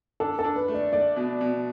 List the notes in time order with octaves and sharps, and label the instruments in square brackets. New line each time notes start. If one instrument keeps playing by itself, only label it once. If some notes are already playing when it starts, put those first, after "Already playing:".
[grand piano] D4 [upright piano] A4
[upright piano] A4
[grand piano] D4
[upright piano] B4
[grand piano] A3
[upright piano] D5
[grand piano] A3 [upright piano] D5
[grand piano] B2
B2